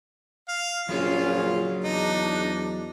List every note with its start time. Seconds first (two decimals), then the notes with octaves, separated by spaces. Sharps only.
0.49 F5
0.89 A#1 F#3 C#4 F4 G#4 C#5
1.84 E2 D4 D#4